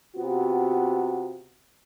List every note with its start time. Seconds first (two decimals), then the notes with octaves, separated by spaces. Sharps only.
0.16 C3 B3 F4 F#4